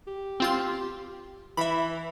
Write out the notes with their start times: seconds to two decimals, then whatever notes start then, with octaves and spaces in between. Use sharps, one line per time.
0.07 G4
0.40 C4 F4 C6
1.57 E3 E5 B5